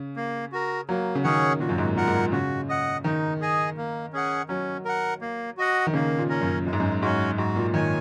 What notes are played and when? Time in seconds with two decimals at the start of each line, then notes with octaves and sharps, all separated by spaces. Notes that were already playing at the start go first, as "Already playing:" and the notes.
Already playing: C#3
0.16 A#3
0.52 F#4 A#4
0.89 F#3 A#3
1.15 C#3
1.24 D#3 C#4 G#4 C#5 F#5
1.60 A#2 F#4
1.69 F#2
1.78 G#2
1.96 A#2 A#4 F#5
2.08 G#2
2.15 A#2
2.32 C#3 F#4
2.69 D#5 F#5
3.04 D#3 D#4
3.41 G#4 D#5 G#5
3.77 A#3
4.13 C#4 G#4 F#5
4.49 F#3 C#4
4.85 A#4 F#5
5.21 A#3
5.57 F#4 D#5 F#5
5.87 D#3
5.93 C#3 A#3
6.18 A#2
6.29 C#4 A#4
6.41 F#2
6.65 F#2 G#3
6.73 G#2
6.80 F#2
7.01 G#2 C#4 F#4
7.38 G#2 F#4
7.56 A#2
7.74 D#3 C#5 G#5